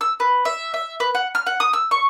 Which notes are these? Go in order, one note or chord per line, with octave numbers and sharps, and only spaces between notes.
E6
B4
E5
E5
B4
F#5
F6
F#5
D#6
E6
C#6